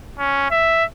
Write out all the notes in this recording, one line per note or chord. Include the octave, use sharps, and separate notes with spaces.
C#4
E5